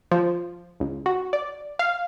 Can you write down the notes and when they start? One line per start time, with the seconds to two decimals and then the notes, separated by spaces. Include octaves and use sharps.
0.11 F3
0.80 C#2
1.06 F#4
1.33 D5
1.79 F5